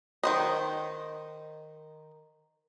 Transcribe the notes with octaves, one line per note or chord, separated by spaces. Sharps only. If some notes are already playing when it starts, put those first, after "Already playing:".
D#3 C5 D#5